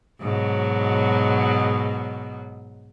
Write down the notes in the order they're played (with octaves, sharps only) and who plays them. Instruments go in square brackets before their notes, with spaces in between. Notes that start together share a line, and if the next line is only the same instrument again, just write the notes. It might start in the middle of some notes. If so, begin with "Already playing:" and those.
[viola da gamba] G#2 B2 F#3